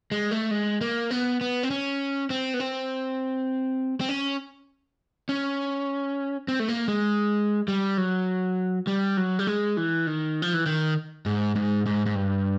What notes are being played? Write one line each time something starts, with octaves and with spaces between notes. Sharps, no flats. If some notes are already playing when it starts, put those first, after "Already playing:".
G#3
A3
G#3
A#3
B3
B3
C4
C#4
C4
B3
C4
C4
C#4
C#4
C4
A3
A#3
G#3
G3
F#3
G3
F#3
G3
G#3
E3
D#3
F3
E3
D#3
G#2
G#2
G#2
G#2
G2